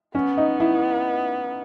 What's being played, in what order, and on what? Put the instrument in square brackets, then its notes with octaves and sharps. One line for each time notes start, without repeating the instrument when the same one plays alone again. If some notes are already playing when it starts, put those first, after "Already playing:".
[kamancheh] B3 [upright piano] C#4
[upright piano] D#4
E4